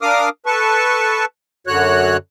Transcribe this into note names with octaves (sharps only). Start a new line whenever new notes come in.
D4 A#4 F5 D6 D#6 F6
A4 B4 A5 C#6
F#2 D3 F#4 C#5 F#6